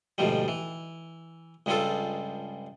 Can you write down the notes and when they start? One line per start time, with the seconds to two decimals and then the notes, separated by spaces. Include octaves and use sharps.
0.18 D2 G#2 B2 F3 G3
0.48 E3
1.66 C#2 G2 G3 G#3 F4 A4